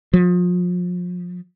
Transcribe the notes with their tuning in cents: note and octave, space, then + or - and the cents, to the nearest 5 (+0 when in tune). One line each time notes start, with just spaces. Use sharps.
F3 +35